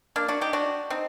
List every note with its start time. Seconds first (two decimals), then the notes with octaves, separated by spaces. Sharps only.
0.16 A#3 D4
0.28 D4 F#4
0.41 D#4 G4
0.53 D4 F#4
0.90 C4 D#4